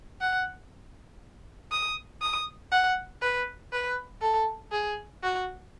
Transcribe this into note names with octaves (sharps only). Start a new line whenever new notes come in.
F#5
D#6
D#6
F#5
B4
B4
A4
G#4
F#4